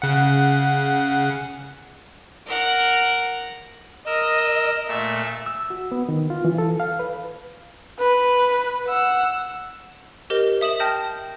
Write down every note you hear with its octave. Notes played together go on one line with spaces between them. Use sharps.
C#3 F#5
A#4 F#5
A#4 D#5 E6
A#2 A3 E5 E6
E6
F#4
B3
D#3
F4
E3
A4
F5
B4
B4
F#5 E6
G4 A#4 C5 D#5
E5 D#6 E7 F#7
G5 A5 F6 G6 A#6